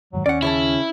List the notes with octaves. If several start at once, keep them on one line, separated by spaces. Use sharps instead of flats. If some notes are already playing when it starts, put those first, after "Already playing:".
F2 G#2 D#3 F#3
D#2 C#4 D5 F#5
C#3 E4 C#5 A5